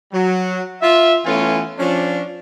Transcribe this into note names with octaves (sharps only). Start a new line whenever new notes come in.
F#3
F4 E5
E3 A3 B3 C#4 F4 G#5
F3 C#4 D4